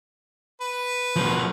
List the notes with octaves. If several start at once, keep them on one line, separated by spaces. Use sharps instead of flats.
B4
B2 F3